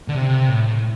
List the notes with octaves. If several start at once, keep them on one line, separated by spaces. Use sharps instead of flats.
D3
C3
A2